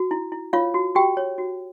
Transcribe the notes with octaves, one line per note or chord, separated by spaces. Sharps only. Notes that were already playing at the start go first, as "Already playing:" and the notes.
Already playing: F#4
E4
E4
F4 C#5 F5
F#4
F#4 G4 G5
C#5
F#4